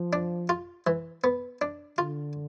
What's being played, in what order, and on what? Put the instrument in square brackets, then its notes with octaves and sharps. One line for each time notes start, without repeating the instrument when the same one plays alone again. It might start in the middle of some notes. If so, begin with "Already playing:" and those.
Already playing: [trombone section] F3
[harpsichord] D4
F4
E3
B3
D4
[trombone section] D3 [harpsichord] F4